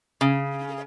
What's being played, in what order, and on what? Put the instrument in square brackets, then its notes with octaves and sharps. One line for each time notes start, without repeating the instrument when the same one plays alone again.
[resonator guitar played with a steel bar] C#3